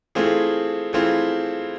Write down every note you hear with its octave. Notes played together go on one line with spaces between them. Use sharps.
E3 A3 C4 F4 G#4
E3 A3 C4 F4 G#4